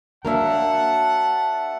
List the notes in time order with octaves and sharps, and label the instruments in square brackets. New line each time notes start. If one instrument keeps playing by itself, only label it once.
[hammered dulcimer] F#3 E5 [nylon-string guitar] A#3 D4 A#4 [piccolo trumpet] F#5 [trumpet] A5